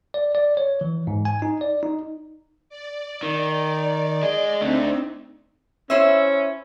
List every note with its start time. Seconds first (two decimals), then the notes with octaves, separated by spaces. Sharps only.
0.14 D5
0.35 D5
0.57 C#5
0.81 E3
1.07 G#2
1.25 G#5
1.42 D#4
1.61 D5
1.83 D#4
2.69 D5
3.23 D#3
4.23 G#4 D#5
4.61 A3 C4 D4 D#4
5.90 C#4 E4 C5 E5